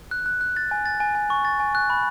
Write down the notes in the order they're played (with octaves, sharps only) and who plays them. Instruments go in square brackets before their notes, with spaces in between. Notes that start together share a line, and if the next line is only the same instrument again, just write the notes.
[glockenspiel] F#6
F#6
F#6
A6
G#5
A6
G#5
G#5
C#6
A6
G#5
F#6
B5